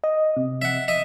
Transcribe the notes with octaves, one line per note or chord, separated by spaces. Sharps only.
D#5
C3
E5 F#5
D#5 E5